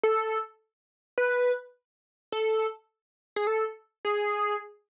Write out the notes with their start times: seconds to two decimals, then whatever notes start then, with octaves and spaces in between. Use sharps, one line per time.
0.03 A4
1.18 B4
2.32 A4
3.36 G#4
3.47 A4
4.05 G#4